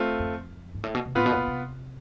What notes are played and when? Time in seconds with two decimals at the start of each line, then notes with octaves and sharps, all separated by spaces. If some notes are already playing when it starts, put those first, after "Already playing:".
Already playing: A3 C4 F4
0.19 F2
0.75 G#2
0.84 A2
0.95 B2
1.05 C3
1.15 A2 B3 F4 B4
1.26 B2
1.32 A2
1.37 B2
1.48 C3